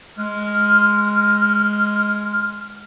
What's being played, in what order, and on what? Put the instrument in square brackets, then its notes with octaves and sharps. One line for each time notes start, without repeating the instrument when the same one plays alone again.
[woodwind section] G#3 F6